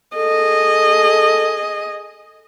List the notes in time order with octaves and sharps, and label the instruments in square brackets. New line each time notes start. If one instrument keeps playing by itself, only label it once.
[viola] G#4 D#5 [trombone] A4